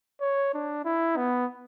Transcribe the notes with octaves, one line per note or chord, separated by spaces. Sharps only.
C#5
D4
E4
B3